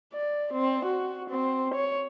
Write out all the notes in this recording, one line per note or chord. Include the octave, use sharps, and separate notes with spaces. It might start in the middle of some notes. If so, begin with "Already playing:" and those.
D5
C4
F#4
C4
C#5